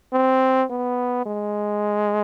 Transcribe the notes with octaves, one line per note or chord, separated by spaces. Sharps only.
C4
B3
G#3